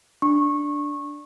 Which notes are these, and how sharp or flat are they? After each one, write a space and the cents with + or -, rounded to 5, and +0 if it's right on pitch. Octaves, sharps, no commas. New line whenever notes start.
D4 +0 C#6 -20